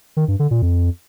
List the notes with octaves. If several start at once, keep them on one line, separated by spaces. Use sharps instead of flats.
D#3
G2
D3
A#2
F2